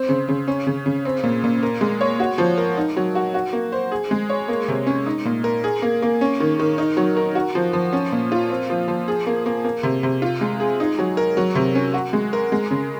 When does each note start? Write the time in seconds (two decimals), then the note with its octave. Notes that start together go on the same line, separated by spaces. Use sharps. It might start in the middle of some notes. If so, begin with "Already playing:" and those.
Already playing: C4 C5
0.09 C#3
0.29 C#3
0.48 C#4
0.67 C#3
0.86 C#3
1.05 C4
1.23 A#2
1.44 A#2
1.63 A#4
1.81 G#3
2.01 C#5
2.20 F#4
2.38 F3
2.58 A#4
2.77 D#4
2.96 F#3
3.15 F#4
3.34 F#4
3.53 A#3
3.72 C5
3.92 G#4
4.11 G#3
4.29 C#5
4.48 A#3
4.68 C3
4.87 C#4
5.06 D#4
5.25 A#2
5.44 A#4
5.64 G#4
5.82 A#3
6.02 A#3
6.21 C#4
6.40 D#3
6.60 D#3
6.78 D#4
6.97 F#3
7.17 A#4
7.35 F#4
7.55 F3
7.73 F3
7.93 C#4
8.12 A#2
8.32 F4
8.50 C4
8.70 F3
8.88 F3
9.08 G#4
9.27 A#3
9.46 A#3
9.64 A#3
9.83 C3
10.03 C3
10.22 F4
10.41 G#3
10.60 G#4
10.80 D#4
10.99 F#3
11.17 A#4
11.37 F#3
11.55 C3
11.75 C#4
11.94 F#4
12.13 G#3
12.33 A#4
12.52 G#3
12.71 C#3